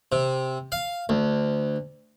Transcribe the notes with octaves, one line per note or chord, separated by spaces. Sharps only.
C3
F5
D2